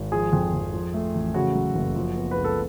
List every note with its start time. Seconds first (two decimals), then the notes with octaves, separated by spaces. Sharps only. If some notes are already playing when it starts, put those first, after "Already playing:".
Already playing: G#1
0.12 F3 G#4
0.33 F2
0.54 F2
0.73 F3
0.94 A3
1.14 A1
1.34 C#3 F#4
1.55 F#3
1.75 F#1
1.96 F3
2.16 B3
2.31 B4
2.37 C#2
2.44 A4